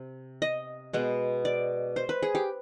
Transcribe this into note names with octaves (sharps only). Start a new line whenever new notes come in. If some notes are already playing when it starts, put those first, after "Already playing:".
Already playing: C3
D#5
B2 G#3 B3
D5
C5
B4
G#4
G4